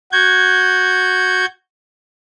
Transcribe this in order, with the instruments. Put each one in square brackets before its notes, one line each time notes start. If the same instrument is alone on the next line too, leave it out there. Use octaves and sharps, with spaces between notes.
[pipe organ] F#4 G6 G#6